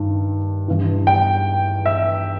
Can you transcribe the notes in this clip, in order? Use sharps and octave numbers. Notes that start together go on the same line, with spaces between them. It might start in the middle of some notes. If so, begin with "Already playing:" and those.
Already playing: G2 D#3
G2 E3
G5
E5